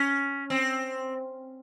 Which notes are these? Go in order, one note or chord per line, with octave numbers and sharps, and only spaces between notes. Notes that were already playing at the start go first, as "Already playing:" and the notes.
Already playing: C#4
C4